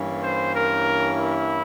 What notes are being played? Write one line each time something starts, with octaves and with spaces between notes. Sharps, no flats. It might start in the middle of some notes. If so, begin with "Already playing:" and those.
Already playing: G2 E3 A#3 C#4
C5
A#4
E4